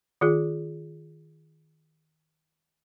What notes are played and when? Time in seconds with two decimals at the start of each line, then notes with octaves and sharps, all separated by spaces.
0.21 D#3 F4 G#4